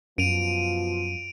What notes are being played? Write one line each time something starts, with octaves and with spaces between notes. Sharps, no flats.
F#2 B2 F3 F4 D7 D#7 F7